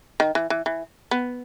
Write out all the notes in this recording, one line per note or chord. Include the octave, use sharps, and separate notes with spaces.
D#3
E3
E3
E3
B3